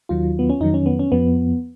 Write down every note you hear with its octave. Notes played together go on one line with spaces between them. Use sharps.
D#2 D#3 F#3 F4
B3
C#4
F2 D#3 F#3 D#4
C#4
B3
C#4
F2 F3 B3